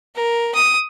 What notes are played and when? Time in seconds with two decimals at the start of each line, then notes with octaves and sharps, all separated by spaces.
0.15 A#4
0.54 D#6